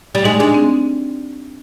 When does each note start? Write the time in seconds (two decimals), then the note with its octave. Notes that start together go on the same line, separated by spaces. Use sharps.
0.15 G3
0.25 G#3 D#4
0.39 G#3 D4
0.54 C4